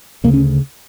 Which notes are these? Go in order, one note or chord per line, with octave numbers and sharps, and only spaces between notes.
D2 C#3 A#3
C#4